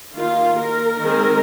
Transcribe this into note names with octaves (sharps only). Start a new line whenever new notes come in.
D#3 A#3 F4
A#4
D#3 G#3 C4